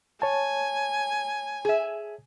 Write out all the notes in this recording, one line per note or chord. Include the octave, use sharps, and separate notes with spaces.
C#5 G#5 A5
G#4 E5